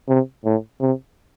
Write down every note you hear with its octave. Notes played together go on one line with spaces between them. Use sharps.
C3
A2
C3